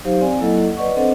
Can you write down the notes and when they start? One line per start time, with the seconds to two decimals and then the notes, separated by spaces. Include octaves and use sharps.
0.04 F#3 D#4 G4 C5 F5
0.21 C4 D5 G#5
0.40 F#3 A#3 E4 A4 D#5 F#5
0.77 B4 D5 D#5 F#5 C#6
0.96 C4 D4 A4 C5 D#5 F#5